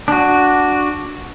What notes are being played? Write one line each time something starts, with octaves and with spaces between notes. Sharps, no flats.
D4 F#4